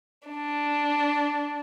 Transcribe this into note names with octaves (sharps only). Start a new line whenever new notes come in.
D4